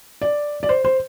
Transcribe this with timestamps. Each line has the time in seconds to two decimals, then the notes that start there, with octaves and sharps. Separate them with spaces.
0.21 D5
0.63 D5
0.69 C5
0.85 C5